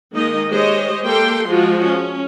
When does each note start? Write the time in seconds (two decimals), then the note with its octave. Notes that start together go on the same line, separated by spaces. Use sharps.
0.13 D#3 G#3 A#3 D#4 D#5
0.50 G#3 G4 C5 C#5 D#5
1.06 A#3 G4 A4 G5 C6
1.48 F3 G#3 F4 F#4
1.85 C#4